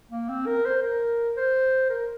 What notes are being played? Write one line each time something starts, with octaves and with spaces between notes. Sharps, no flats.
A#3
C4
A#4
C5
A#4
C5
A#4